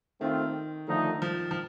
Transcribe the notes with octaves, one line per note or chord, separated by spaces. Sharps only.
D#3 A3 C4 F4
D3 D#3 F3 A3 D#4
F3
F3